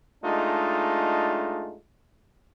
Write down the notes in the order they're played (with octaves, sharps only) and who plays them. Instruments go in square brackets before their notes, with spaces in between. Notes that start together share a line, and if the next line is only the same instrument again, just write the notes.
[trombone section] G#3 A3 D4 D#4 F4